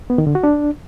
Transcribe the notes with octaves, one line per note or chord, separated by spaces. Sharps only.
B3
D#3
D3
F#4
D4